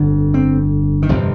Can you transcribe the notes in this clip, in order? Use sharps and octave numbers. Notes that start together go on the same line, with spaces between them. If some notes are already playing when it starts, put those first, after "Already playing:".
Already playing: G1 F2 D3
C4
D#3
G1 F2 C3 F3